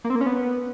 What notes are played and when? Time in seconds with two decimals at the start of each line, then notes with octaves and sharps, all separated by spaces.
0.04 A#3
0.10 C4
0.15 A#3
0.21 C#4
0.26 B3